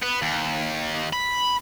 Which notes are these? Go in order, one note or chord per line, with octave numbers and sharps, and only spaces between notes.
B3
D#2
B5